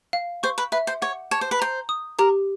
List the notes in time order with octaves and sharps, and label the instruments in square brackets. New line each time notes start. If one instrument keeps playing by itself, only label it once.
[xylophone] F5
[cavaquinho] C5 [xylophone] C#6
[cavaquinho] B4
[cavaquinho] B4 [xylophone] E5
[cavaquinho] C5
[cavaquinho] C#5 [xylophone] F#5
[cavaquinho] C#5 [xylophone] A5
[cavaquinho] C5
B4
[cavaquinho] C5 [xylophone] A#5
[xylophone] D#6
[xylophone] G4 [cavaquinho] A#4